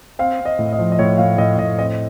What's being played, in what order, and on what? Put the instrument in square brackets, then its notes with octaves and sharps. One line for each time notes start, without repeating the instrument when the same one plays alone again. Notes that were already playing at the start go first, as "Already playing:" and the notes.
[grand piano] C4 F5
C4
D#5
A2
D#5
F3
D#5
A2 C#5
A2 F5
A2 D#5
A2 D#5
C4 D#5